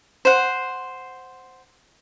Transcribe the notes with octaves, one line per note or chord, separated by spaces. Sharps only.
C5 F#5